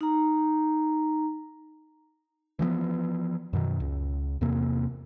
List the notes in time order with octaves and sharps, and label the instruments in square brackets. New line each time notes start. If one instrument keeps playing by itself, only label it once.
[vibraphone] D#4 A#5
[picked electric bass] E3 F3 G#3 B3
F#2 B2 D#3
C#2
E2 C3 A#3